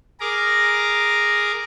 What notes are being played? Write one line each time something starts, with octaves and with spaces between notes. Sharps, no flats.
G#4 A#4 A#5 D6